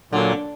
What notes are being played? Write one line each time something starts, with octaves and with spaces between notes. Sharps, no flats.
A#2 D3 F#3 A#3